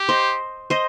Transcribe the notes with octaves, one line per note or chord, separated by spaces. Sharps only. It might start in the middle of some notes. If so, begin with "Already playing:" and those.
Already playing: G4
C5 D#5
C5 D#5